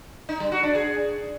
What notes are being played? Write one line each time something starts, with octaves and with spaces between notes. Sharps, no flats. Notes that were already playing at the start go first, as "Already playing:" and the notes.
D#4
G3
F#4
D4
G#4